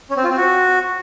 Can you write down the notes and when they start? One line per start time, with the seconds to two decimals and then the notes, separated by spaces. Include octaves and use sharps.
0.10 C#4
0.17 C4
0.24 F4
0.31 C4
0.37 F#4